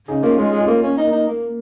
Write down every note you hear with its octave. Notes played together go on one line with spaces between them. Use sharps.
C#3 D#4 G#4
A#3 C#4 F4
G#3 C#4 F4
G#3
C#4 F4
A#3
A#3 C#4
D#4
A#3
D#4
A#3